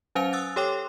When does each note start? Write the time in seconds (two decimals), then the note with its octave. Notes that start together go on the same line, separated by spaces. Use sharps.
0.15 F#3 C#4 C5 F5 G#5 F7
0.33 D#6 E6 F#6 A6
0.56 G4 A4 C#5 G5 C6 D6